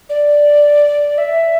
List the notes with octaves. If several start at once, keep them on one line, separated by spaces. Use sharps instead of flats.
D5
E5